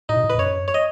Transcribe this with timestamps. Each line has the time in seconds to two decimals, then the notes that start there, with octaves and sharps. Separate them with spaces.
0.09 A2 D#4
0.16 B2
0.24 A2
0.30 B4
0.35 G#2
0.38 F#2 C#5
0.68 C#5
0.74 D#5